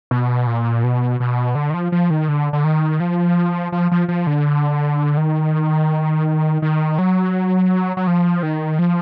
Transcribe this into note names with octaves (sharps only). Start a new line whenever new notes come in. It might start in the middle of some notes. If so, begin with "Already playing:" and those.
B2
A#2
B2
B2
D3
D#3
F3
F3
D#3
D3
D3
D#3
F3
F3
F3
F3
D3
D#3
D#3
F#3
F#3
F3
D#3
F3